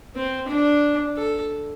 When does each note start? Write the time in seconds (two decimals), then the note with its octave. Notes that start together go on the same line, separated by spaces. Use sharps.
0.16 C4
0.49 D4
1.17 A4